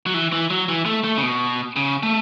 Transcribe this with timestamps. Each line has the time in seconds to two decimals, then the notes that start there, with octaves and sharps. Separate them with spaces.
0.06 F#3
0.14 E3
0.32 E3
0.50 F#3
0.69 E3
0.86 A3
1.04 A3
1.17 C#3
1.22 B2
1.76 C#3
2.03 A3